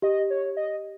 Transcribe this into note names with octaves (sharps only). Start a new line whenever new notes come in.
G4 D#5
C#5
D#5